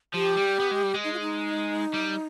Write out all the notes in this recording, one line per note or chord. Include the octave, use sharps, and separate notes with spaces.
F3 G4
G3
B3
G#3
G3
G#3
D#4
F4
D#4
G3